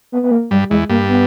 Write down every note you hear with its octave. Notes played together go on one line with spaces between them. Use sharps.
B3
B3
A#3
G2 G3
E2 G#3
G2 A#3
B3